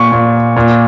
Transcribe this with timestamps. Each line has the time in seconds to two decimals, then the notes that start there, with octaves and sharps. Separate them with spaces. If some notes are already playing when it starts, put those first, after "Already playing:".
Already playing: A#2 C#6
0.12 A#2
0.56 A#2